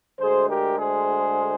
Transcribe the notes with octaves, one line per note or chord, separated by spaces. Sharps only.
D2 D3 G#3 G#4 C5
G4 A#4
G#4 C5